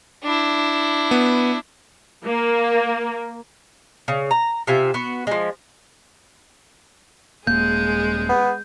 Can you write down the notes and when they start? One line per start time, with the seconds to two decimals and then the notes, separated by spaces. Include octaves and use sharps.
0.23 D4 E4
1.11 B3
2.26 A#3
4.08 C#3
4.31 A#5
4.67 C3 F4 E5 G#5
4.94 B3 F#4
5.27 F3 G#3
7.47 D#1 G#3 A#3 G#4 G6
8.29 B3